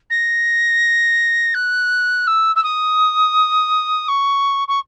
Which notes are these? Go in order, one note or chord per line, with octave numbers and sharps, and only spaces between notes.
A#6
F#6
E6
E6
D#6
C#6
C#6